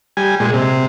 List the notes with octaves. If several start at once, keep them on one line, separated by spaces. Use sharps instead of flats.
G3 G#5
A#2 G#3
C3